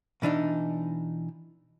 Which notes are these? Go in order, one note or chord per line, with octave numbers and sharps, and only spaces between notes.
B2 E3 D4 D#4